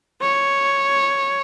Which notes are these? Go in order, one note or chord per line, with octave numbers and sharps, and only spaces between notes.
C#5